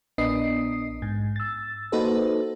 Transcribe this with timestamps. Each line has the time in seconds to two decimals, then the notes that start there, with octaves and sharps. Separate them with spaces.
0.18 A#1 B3 D4 D#5 D#6 C7
1.02 G#2
1.36 E6 A6
1.92 A#3 D#4 F#4 A4 B4 C5